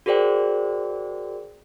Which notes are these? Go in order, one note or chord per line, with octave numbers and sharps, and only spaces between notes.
F#4 G#4 A#4 C5 D5 G5